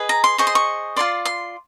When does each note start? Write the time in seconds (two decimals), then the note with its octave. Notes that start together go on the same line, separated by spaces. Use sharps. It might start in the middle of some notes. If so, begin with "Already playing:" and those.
Already playing: G#4 B4 D#5
0.09 A#5
0.24 C6
0.38 G#4 C5 D#5 C#6
0.47 C6
0.55 C#6
0.96 F4 A4 D5 C6
1.25 C6